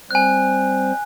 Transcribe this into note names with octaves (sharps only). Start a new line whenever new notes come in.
G3 C4 C5 G#5 F#6